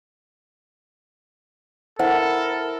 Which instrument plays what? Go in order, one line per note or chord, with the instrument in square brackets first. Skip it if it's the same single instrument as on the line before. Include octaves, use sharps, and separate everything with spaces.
[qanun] E4 [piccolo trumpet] A4 [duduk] A#4 [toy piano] C5 F#5